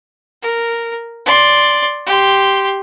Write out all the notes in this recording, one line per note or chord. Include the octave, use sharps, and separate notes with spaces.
A#4
D5 C6
G4 C6